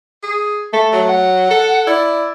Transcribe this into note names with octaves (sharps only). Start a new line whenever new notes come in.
G#4
A3 A4
F#3
F#5
A4
E4 D5